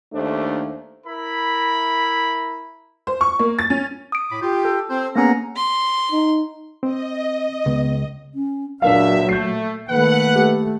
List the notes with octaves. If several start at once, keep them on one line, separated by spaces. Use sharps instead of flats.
D#2 A3 D4 C5
E4 A#4 B5
C5
C#6
A#3
A6
C#4
D#6 D7
A2 B5 D6
F4 G4
A4
C4 C5
A#3 B3 C#4 G#4 F#5 A#5
C6
D#4
C4 D#5
C#2 B3
C#4
C#2 A#2 F#3 D4 A#4 E5 F5
A3 G6 C7
D#3 A3 A#3 B4 F#5
A3 G4